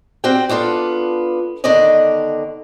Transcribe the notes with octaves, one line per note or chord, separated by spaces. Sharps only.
C4 F#4 G4 D5 G5
B3 D4 F4 A4
D3 D#3 B3 D5 D#5